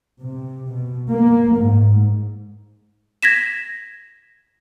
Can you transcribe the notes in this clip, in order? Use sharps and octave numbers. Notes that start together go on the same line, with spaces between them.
C3
B2
A#3
G#2
G#6 A#6 B6 E7